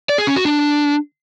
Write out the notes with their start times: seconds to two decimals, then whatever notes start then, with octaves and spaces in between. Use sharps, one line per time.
0.09 D5
0.18 G#4
0.27 C#4
0.36 F#4
0.45 D4